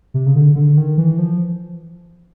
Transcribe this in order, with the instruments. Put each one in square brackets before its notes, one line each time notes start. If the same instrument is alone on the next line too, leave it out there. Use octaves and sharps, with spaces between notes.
[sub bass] C3
C#3
D3
D3
D#3
E3
F3